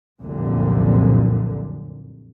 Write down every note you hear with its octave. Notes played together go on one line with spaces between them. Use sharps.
F1 C2 F#2 A#2 D3